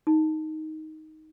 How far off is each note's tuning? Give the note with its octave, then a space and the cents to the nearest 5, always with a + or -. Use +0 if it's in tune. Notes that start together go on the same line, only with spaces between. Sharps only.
D#4 +10